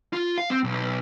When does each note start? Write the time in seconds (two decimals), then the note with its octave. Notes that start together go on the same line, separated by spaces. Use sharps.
0.13 F4
0.38 F5
0.50 C4
0.64 B1